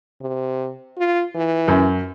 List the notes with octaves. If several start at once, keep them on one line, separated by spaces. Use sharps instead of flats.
C3
F4
E3
F#2